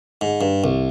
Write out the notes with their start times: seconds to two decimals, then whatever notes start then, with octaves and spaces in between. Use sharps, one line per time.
0.21 G#2
0.41 G2
0.64 C2